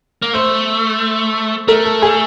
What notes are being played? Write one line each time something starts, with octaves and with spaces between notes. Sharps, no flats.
A#3
A3 C5
A3 A#4
A4
G#4